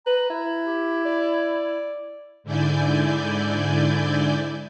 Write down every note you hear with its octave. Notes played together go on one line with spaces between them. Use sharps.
B4 A#5
E4
G4
D5
G#2 D3 E4 D5 G#5 G6